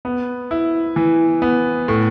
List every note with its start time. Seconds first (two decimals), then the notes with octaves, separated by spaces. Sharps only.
0.05 B3
0.51 E4
0.96 E3
1.42 B3
1.88 A2